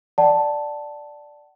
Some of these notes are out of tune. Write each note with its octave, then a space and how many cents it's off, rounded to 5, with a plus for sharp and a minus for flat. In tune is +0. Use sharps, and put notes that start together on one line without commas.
D5 +0 F#5 +30 A5 +0